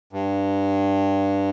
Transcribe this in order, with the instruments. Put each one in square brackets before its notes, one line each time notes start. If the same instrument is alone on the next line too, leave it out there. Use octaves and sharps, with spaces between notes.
[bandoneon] G2